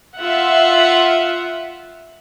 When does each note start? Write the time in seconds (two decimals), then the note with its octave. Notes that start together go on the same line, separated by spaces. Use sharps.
0.18 F4 E5 F#5